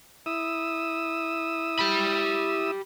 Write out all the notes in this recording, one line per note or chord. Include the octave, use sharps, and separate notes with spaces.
E4 D#6 E6
G4 B5